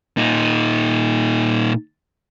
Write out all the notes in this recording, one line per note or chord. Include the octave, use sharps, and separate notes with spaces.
A#2 D#4